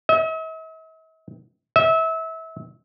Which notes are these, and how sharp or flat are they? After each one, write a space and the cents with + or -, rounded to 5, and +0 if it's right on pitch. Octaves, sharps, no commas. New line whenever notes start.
E5 -45
E5 -25